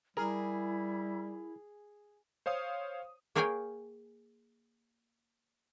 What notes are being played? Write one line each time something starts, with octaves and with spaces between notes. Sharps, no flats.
G3 E4 G#4 A#4
C5 C#5 F5 D#6
A#3 G#4 A#4 C#5 G5 G#5